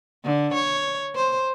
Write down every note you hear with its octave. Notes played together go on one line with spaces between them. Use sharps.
D3
C#5
C5